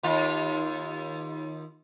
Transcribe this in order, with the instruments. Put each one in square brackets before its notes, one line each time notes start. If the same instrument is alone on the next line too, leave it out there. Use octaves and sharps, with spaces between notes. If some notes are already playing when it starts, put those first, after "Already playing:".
[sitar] D#2 F4